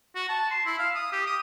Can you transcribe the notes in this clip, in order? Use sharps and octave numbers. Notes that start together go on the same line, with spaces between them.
F#4
A5
C6
E4
F5
D#6
G4
D#6